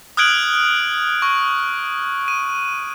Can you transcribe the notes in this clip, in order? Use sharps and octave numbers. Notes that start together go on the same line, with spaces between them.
D#6 F6 F#6 G#6 D7 F#7
C#6
D#7